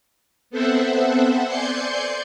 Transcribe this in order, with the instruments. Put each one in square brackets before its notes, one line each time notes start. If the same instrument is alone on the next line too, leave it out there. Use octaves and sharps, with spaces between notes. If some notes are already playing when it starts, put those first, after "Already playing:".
[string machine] B3 C4 A4 C5 E5 F#5
D5 G#5 C6 G6 C#7